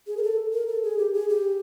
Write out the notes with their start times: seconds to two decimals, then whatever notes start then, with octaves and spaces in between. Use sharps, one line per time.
0.07 G#4
0.17 A#4
0.23 A4
0.53 A#4
0.68 A4
0.83 G#4
0.98 G4
1.14 G#4
1.29 G4